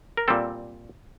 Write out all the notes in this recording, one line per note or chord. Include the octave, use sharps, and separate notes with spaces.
A#4
A#2 G3 C4 A4